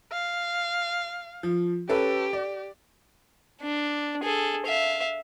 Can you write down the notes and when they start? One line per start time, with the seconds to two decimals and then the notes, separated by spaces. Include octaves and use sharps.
0.12 F5
1.43 F3
1.89 C#4 G4 A4 B4
2.33 D5
3.62 D4
4.24 G#4 A4
4.66 E5 F5